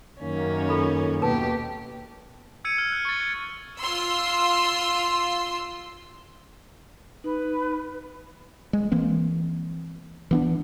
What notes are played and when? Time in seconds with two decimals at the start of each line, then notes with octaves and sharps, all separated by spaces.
0.21 F#2 D#3 A#3 C#4
0.69 F4 A4 B5
1.22 D#2 B2 G4 B4 A5
2.65 E6 G#6 C#7 D#7
2.78 F6
2.92 F#6
3.05 C#6 A6
3.21 G#6
3.79 F4 C6 E6
7.24 D#4 B4
8.73 G#3
8.92 E3 A#3 C4
10.31 E3 B3 D4